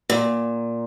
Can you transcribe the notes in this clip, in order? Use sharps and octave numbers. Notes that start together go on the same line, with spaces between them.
A#2